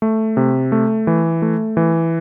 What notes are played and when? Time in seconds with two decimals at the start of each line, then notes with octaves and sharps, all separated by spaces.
0.02 A3
0.37 C3
0.72 A3
1.07 E3
1.42 A3
1.77 E3